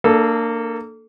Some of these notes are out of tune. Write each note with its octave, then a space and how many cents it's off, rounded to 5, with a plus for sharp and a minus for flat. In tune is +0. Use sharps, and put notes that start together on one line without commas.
A#3 -20 D4 +25 A4 +0